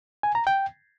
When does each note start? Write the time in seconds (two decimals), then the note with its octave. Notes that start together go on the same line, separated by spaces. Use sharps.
0.23 G#5
0.35 A#5
0.47 G5